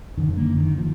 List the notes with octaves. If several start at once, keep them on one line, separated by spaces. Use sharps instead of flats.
F#2 D3 D#3
A#3
D#3
F3